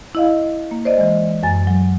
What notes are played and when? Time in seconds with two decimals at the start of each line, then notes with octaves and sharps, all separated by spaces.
0.15 E4 D#5 F5
0.71 A#3
0.85 C5 D5 D#5
0.98 E3 G#3
1.43 F#2 G#5 A6
1.67 F#3